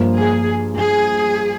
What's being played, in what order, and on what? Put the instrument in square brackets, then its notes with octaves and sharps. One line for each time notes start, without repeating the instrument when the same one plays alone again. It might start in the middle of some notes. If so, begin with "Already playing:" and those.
Already playing: [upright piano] G2 F3 A#3 F4 C5
[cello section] G#4
G#4